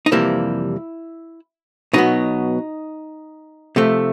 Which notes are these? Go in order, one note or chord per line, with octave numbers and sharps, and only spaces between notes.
D#4
F2 C3 E3 G3 A#3 E4
B2 F#3 B3 D#4
C3 F3 A3